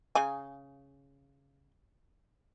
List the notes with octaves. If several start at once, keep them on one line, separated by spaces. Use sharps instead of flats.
C#3 G#5